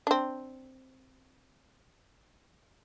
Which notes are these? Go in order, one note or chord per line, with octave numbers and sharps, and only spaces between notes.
C4 D4